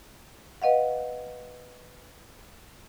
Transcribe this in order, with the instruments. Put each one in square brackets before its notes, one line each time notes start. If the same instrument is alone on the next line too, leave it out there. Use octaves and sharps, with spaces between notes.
[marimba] B4 D#5 F5 F#5